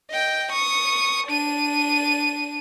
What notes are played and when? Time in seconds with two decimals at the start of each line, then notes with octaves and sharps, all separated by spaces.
0.11 D#5 G5
0.52 C#6 D#6
1.27 D4 D#7